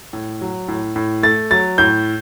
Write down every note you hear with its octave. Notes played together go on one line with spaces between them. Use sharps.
A2
F#3
A2
A2
A3 A6
F#3 A6
A2 G6